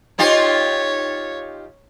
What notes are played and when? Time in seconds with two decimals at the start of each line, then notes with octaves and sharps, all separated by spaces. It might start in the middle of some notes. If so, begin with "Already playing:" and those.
0.19 D#4 F4 G4 C#5